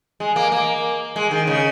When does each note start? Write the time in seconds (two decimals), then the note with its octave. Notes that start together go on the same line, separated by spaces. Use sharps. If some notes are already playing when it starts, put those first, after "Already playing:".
0.20 G#3
0.36 A#3
0.52 A#3
1.16 G#3
1.31 D#3
1.47 C#3